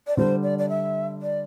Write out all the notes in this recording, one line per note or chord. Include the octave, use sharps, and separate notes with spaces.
D5
D3 G3 D4 C5
D5
D5
E5
D5